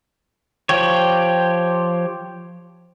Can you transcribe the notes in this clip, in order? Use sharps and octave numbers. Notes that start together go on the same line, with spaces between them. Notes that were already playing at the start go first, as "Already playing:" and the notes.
F3 G4 C#5